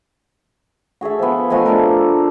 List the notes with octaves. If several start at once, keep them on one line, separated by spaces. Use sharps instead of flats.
F#4 G#4 A4 E5
F3 B3
F3 A3 D#5 G#5
A3 D4 A4 A#4